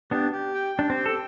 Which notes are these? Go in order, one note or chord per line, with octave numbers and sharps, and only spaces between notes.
B3 D4 G4
G4
G5
D4 G4
C4
G5
A4